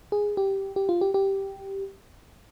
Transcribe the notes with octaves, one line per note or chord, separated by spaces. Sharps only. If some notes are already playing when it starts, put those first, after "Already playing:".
G#4
G4
G4
F4
G4
G4